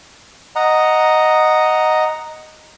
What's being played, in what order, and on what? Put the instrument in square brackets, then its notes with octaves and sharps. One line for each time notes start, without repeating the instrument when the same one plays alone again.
[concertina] D#5 F#5 A#5